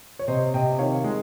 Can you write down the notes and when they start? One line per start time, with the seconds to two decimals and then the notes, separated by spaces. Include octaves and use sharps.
0.19 C#5
0.28 C3 C5 D#5
0.54 C3 D#5 G5
0.79 D#3 C#5 F5
1.04 G#3